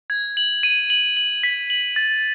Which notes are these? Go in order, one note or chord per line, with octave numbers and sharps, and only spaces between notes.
G#6
F#7
D#7
F#7
F#7
B6
F#7
A6